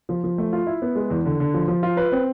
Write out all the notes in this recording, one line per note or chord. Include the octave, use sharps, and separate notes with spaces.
F3
F3
A3
F4
E4
B3
G#3
E2
D3
D3
F3
F3
F4
B4
C4